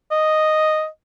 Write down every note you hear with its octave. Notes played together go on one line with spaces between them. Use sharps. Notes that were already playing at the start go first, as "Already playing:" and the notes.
D#5